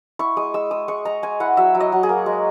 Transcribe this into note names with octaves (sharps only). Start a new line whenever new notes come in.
E4 C#6
G#3 D#6
G#3 E6
G#3 D#6
G#3 C#6
G#3 A#5
G#3 G#5
E4 F#5
F#3 E5
F#3
D#5
F#3
G#4
A#3
G#3